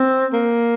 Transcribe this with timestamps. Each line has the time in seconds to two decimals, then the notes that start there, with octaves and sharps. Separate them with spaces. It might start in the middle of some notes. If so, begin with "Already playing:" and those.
Already playing: C4
0.33 A#3